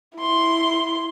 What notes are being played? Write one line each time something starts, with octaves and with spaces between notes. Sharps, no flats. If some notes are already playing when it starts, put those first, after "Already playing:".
E4 C6